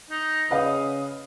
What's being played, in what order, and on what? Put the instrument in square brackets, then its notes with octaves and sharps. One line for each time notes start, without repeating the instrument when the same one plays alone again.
[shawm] D#4
[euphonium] C#3 [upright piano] B4 D#5 F5 [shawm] D#6